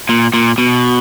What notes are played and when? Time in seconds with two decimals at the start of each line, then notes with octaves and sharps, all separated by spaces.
0.09 A#2
0.34 A#2
0.58 B2